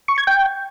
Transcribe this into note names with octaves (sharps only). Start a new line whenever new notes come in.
C#6
G#6
G5